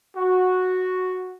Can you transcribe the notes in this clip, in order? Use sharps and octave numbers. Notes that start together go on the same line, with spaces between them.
F#4